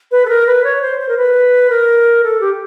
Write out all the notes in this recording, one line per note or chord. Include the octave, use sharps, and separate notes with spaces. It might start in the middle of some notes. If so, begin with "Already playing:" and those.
B4
A4
A#4
B4
C#5
C5
C5
A#4
B4
A#4
A4
G4